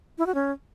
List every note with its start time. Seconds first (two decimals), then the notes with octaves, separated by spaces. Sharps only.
0.18 E4
0.26 F#4
0.35 C#4